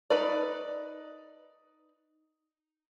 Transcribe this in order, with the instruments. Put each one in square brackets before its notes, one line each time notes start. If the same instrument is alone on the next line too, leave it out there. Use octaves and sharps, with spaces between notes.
[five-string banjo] D#4 B4 D5